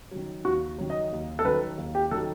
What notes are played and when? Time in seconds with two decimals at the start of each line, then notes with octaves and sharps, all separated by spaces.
0.11 D#3 F#3
0.45 D#2 F#4
0.78 D#3 F#3
0.90 D#5
1.12 D#2
1.39 A4
1.45 D#3 F#3 B4
1.78 D#2
1.95 G4
2.11 D#3 A4
2.14 F#3